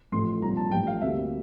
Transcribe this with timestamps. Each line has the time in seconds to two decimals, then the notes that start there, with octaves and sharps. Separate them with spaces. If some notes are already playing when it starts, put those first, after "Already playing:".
0.12 A1 A2 F3 C6
0.42 C2 A#2 F3 A#5
0.57 A5
0.71 A1 G2 F3 G5
0.87 F5
1.01 D2 C3 G3 A#3 E5